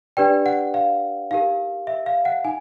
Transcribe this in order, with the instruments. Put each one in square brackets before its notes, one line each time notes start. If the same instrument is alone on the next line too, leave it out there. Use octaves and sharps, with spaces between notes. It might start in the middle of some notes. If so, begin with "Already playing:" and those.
[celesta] D4 G4 B4 D5 G5
F#5
F5
D#4 G4 A#4 F5
E5
F5
F#5
D#4 G#5